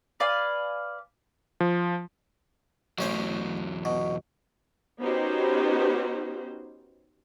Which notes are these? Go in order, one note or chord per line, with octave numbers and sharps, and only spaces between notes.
B4 D5 F5 G#5
F3
A1 E2 F#3 C#4 C5
B2
B3 C#4 D#4 F#4 G4 C5